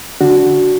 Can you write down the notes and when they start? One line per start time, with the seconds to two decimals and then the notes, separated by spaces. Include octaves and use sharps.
0.21 D3 D4 F#4